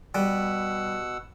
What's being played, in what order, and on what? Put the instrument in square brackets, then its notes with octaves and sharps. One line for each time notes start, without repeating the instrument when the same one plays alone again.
[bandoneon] B2 F#5 E6 [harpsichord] G3